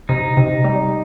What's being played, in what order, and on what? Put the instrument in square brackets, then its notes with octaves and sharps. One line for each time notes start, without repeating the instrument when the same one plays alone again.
[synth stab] C3 [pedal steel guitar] D#4
[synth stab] C3
G3